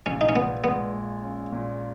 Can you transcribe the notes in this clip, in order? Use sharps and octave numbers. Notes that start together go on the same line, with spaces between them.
A#1 C#4
D#4
C#4
A#2 B3
G#3 B3
A#2
C#4
A#2